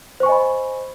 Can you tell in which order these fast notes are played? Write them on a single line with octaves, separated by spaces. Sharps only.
C5 C#6 G#5 D#5 B5